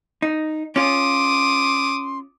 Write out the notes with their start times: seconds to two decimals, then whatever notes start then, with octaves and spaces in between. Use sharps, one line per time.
0.22 D#4
0.76 C#4 F4 C6 D6 D#6